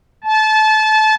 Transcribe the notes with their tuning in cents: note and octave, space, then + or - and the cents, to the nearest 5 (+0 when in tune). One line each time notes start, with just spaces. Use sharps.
A5 -25